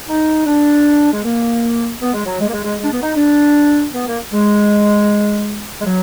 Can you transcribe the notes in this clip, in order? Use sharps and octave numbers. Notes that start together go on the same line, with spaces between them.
D#4
D4
G#3
A#3
B3
G#3
F#3
G#3
A#3
G#3
G#3
G#3
D4
B3
D#4
D4
B3
A#3
G#3
G#3
F#3